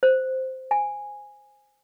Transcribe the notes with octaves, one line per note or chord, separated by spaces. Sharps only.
C5
G#5